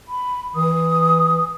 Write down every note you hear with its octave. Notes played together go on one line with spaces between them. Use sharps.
B5
E3 D#6